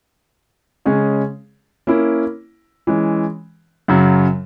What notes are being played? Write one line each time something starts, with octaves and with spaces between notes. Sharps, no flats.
C#3 G#3 C#4 G#4 C#5
A#3 C#4 E4
E3 G#3 C#4
F#2 C#3 F#3